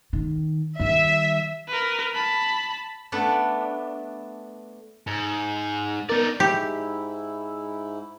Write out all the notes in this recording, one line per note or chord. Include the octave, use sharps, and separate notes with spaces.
D#3
D#3 G3 E5
A#4 B4
A5 B5
A3 B3 D4
G#2
B3 D#4 A#4 D5
G#2 E4 G4